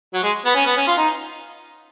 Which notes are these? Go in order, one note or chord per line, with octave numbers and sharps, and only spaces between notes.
F#3
G#3
B3
C#4
B3
C#4
F4
D#4